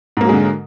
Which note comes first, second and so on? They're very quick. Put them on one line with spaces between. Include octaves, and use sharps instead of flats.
G#2 A#3 F#3 G#3 D3